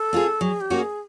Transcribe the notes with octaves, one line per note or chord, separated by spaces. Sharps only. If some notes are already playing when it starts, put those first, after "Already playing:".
Already playing: A4
C4 F4 G#4
F#3 G#4
G4
A#3 C#4 F#4
G#4